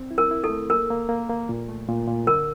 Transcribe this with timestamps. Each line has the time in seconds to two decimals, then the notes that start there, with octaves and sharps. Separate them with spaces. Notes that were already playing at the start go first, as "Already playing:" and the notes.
Already playing: C4
0.11 E4
0.18 A#4
0.31 E4
0.44 A4
0.50 A3
0.70 A#3 A#4
0.90 A#3
1.09 A#3
1.30 A#3
1.49 A#2
1.68 A3
1.88 A#2
2.07 A#2
2.27 D3 A#4